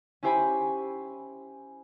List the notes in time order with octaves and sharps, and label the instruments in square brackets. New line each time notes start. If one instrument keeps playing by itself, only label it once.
[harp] C#4 E4 G4 C5 G#5 B5